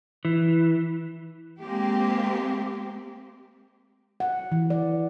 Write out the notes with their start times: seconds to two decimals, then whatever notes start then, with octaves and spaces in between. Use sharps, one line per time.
0.25 E3
1.61 G#3 A#3 C4 G4
4.20 F#5
4.52 E3
4.70 D5